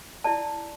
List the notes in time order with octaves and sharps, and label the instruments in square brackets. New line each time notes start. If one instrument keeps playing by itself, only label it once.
[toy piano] E4 D5 A5